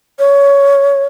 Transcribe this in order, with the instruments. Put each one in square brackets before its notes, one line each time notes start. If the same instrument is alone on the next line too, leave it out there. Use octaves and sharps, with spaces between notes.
[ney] C#5